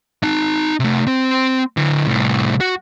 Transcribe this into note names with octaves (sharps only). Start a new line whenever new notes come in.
D#4 A5
C3 A3
C4 C5
D3 E4
C2 A2
F#4